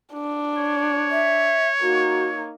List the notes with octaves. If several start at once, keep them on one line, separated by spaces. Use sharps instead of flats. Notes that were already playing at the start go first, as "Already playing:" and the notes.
D4
C#5
E5
A#3 D#4 F#4